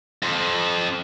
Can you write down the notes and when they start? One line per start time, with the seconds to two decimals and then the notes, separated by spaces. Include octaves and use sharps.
0.23 F2